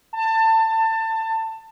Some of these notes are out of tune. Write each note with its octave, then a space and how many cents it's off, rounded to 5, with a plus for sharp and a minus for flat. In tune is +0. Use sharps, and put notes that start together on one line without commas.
A5 +25